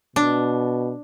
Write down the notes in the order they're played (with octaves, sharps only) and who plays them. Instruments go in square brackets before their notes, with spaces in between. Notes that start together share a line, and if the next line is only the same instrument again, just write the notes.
[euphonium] B2 [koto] D4